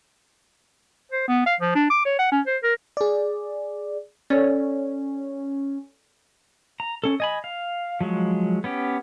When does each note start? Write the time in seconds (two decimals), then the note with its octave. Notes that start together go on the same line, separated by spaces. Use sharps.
1.11 C5
1.28 B3
1.46 F5
1.60 F3
1.75 D4
1.90 D6
2.05 C#5
2.19 F#5
2.31 C#4
2.46 C5
2.63 A#4
2.97 G#4 D5
4.30 C#4 A4 C#5 D5
6.80 A#5
7.04 C#4 A4
7.20 D#5 G#5 B5
7.44 F5
8.01 F3 F#3 G#3
8.64 B3 C#4 G4